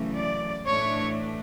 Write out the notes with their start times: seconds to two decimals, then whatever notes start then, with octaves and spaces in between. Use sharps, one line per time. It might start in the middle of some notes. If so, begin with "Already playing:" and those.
Already playing: F#2 C#3 E3 A3 C#4
0.15 D5
0.65 A2 E3 A3 D4 C#5